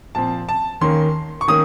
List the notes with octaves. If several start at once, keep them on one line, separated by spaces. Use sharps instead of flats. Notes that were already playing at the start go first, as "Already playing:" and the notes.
A#2 F3 C4 A5
A5
D#2 D#3 A#3 C#4 C6
C#6
D#3 A#3 C#4 D#6